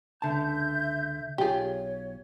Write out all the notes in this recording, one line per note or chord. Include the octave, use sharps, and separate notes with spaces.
C#2 D3 E5 A5 G6
B1 F4 G4 G#4 C#5